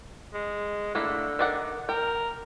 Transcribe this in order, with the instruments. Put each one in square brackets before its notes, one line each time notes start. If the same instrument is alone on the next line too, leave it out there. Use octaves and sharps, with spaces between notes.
[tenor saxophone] G#3
[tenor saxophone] D3 [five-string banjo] A3 A#3 E4
[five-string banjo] D#3 D5 F#5
[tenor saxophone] A#4 [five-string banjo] G5